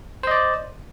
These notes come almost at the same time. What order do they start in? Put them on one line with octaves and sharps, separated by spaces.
C5 D#5 D5